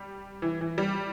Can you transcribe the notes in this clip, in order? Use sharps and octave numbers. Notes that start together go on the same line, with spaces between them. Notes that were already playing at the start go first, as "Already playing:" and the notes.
Already playing: G3
E3
E3
G3